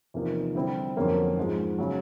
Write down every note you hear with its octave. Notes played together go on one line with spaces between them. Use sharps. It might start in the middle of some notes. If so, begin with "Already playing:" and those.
E2 C3 F3 A#3 D#4
D3 G3 C4 E4
F2 D3 F#3 A#3 C#4
G#2 F3 G#3
C#3 F#3